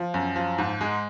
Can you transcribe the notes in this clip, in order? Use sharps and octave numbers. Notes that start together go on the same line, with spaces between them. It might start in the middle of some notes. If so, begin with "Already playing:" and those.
Already playing: F3
F#2
F3
G#2
G#3